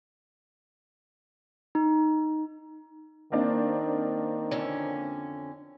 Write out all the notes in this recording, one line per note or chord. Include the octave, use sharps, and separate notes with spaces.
D#4
D#3 A#3 C4 D4
F2 D3 C#4